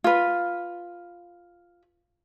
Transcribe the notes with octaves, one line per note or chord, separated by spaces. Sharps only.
F4 B4